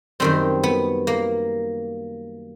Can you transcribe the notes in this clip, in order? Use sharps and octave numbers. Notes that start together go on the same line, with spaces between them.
F#2 D#3 G3 C4
B3
A#3